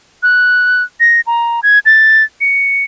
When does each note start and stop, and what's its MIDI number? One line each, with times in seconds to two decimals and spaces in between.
0.23 0.83 90
1.00 1.21 94
1.27 1.60 82
1.63 1.79 92
1.86 2.24 93
2.41 2.84 97